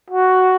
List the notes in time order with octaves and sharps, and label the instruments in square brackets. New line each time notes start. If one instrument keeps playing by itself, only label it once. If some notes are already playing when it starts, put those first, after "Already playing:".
[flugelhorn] F#4